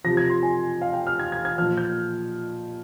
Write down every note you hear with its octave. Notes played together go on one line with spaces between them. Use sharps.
C3 F3 A#6
G#6
C6
G#5
F5
G5
F6
G#6
G#6
G#6
A#2 F3 F6
G6